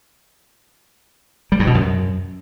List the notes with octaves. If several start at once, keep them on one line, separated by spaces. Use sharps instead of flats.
G3
G2
B2
F#2